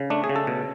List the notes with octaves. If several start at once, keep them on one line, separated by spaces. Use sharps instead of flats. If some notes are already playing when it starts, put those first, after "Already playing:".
Already playing: C#3
A3 D4
G#4
C#3
A4
B2